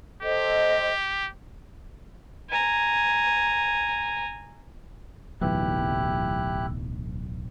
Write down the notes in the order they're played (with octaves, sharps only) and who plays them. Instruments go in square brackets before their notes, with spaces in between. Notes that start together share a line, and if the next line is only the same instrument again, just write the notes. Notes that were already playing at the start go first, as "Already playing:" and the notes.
[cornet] G4 [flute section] A4 C5 D#5
[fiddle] G#5 A#5
[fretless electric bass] D1 B1 E3 [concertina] E4 G4 F#6